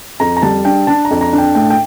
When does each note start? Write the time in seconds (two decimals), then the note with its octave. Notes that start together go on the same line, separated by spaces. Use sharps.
0.20 F2 A#5
0.37 A#5
0.42 G3 A5
0.65 D4 G5
0.87 D4 A5
1.05 A#5
1.11 F2
1.21 A#5
1.33 D4
1.38 G5
1.55 A2 G5
1.70 G5